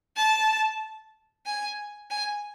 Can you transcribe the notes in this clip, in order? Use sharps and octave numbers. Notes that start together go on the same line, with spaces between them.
A5
G#5
G#5